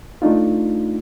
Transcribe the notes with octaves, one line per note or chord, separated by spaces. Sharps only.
A3 D4 D#4 F4